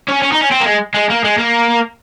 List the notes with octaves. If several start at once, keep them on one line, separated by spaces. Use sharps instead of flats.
C#4
C#4
D#4
C#4
C4
A#3
G#3
G#3
A#3
G#3
A#3